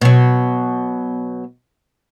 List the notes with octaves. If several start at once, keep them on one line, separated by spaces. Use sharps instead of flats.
B2 F#3